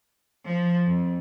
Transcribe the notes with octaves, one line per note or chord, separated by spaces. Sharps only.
F3
F2